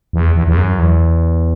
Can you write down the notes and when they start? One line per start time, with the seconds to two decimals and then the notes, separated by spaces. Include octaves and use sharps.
0.13 E2
0.35 E2
0.47 E2
0.57 F#2
0.79 E2